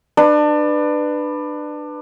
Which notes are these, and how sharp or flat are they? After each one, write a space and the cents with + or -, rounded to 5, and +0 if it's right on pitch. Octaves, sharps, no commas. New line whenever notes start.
D4 +25 B4 +5